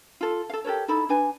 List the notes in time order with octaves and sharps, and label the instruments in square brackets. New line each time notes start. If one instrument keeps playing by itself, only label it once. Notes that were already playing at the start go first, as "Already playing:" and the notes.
[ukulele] F4 A4
A4 F5
G4 A4 A#4 C#5
D#4 E4 A4 B5
D4 B4 G#5